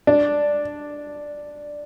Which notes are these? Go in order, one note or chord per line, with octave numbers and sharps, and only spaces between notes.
D4